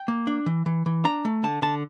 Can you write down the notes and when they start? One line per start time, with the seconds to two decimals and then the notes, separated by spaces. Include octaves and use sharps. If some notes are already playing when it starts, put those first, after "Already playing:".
Already playing: G5
0.08 A#3
0.27 D4
0.46 E3
0.66 E3
0.86 E3
1.05 D4 A#5
1.25 A3
1.44 D3 A5
1.62 D3 A5